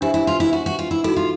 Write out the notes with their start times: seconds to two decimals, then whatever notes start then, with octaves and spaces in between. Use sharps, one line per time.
0.01 D4 E4 G4 C5 E5 G#5
0.14 E4
0.27 F4
0.40 E4
0.53 F#4
0.66 F#4
0.79 F4
0.91 E4
1.04 D#4 E4 F#4 A4
1.16 F4